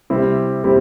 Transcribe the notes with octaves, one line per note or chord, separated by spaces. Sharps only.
C3 G3 C4 E4 G4
C3 G3 C4 E4 G4